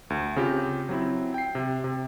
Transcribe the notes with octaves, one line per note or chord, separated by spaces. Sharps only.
D2
C#3 C4 F4 G4
F#3 C4 E4
G5 C7
C3
C3